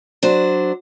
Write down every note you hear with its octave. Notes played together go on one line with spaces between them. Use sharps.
F#3 D4 C5